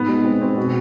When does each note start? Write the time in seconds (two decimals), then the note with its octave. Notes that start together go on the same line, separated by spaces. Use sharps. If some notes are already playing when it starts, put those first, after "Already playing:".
Already playing: G#2 B3 B4
0.08 G#3
0.25 C4
0.42 C4
0.57 B2